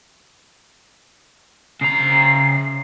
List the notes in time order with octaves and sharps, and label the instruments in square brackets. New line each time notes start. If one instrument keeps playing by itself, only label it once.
[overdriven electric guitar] C#3 A#5 [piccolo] C7